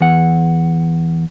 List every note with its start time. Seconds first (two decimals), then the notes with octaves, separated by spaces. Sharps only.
0.01 E2 F#5